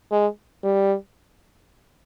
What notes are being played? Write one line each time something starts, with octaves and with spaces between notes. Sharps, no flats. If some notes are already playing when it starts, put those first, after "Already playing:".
G#3
G3